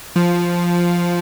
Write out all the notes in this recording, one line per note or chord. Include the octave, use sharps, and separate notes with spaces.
F3